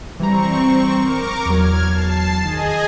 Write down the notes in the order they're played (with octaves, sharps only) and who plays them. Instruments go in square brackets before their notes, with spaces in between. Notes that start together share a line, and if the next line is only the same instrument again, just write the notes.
[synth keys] E3 G3 A#5 [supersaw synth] C4 C#6
[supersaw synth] A#4 C#6 D6
[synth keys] E2 F#3 [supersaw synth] F6 G#6
[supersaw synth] A5 C7
[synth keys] D#3 [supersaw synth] G#4 D#5 G#5